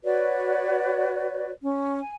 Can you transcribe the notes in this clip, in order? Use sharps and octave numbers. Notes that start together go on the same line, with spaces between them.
F#4 B4 C#5 D5
C#4
G#5